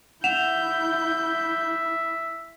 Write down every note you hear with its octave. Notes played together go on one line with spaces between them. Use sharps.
E4 E5 F#5 G6 E7 F7